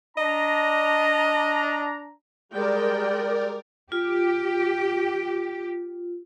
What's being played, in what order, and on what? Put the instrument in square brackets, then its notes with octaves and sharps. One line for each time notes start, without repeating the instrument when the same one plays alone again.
[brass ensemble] D4 A#5 [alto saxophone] D#5
[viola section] G3 G#3 G5 [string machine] A#4 D5
[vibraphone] F4 [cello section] G4